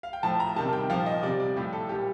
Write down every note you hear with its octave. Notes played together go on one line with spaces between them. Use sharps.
F5
G5
A2 F3 A5
A#5
C3 D#3 G3 A5
G5
A#2 F3 F5
D#5
C3 G3 D5
D5
A2 F3 G4
A4
A#2 G3 G4